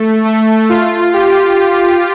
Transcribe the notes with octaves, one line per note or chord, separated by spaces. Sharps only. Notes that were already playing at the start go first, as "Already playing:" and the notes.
Already playing: A3
A3
F4
G4